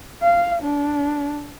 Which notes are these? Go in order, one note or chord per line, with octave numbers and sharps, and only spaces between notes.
F5
D4